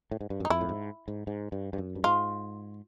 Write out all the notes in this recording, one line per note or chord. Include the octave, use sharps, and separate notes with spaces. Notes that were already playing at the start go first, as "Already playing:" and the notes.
A2
G#2
G2
F#2
D#4
F2 E4
A2
G#2
G#2
G#2
G2
G2
F#2
G2
G#2 F4